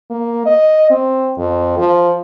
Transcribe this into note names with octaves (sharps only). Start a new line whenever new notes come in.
A#3
D#5
C4
F2
F3